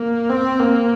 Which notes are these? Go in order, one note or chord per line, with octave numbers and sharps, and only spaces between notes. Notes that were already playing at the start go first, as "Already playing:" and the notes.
Already playing: A#3
C4
A#3